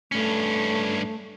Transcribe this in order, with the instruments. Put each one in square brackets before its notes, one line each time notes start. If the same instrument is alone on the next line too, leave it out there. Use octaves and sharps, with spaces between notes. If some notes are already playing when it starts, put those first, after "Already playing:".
[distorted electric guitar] G2 C#4 [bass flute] A3